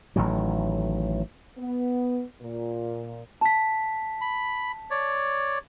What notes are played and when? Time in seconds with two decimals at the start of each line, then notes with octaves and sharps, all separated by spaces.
0.16 A1 A2 D#3 F#3
1.58 B3
2.41 A#2
3.41 A5 B6
4.21 B5
4.91 C#5 D5